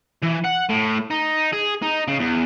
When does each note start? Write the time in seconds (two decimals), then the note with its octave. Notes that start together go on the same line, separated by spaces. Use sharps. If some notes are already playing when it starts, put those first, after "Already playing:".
0.23 E3
0.45 F#5
0.70 A2
1.11 D#4
1.53 G#4
1.83 D#4
2.08 C#3
2.20 E2